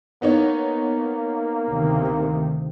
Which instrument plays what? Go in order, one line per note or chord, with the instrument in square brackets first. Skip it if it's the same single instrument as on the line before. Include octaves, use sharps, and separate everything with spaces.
[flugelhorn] A#3 [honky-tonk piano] B3 D#4 C#5
[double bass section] D2 C3 D#3